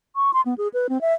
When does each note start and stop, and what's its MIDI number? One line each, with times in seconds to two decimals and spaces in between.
0.16 0.31 85
0.34 0.41 84
0.46 0.54 59
0.58 0.68 68
0.74 0.87 71
0.89 1.01 60
1.01 1.14 76